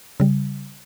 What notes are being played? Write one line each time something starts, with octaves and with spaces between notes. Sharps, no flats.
C#3 G3